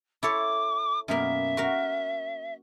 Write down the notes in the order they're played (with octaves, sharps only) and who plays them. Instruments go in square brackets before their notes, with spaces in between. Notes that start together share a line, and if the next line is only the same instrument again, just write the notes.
[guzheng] E4 A4 C#5 [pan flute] D6
[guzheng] F#2 B2 A#3 [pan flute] E5
[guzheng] F#4 A#4 F5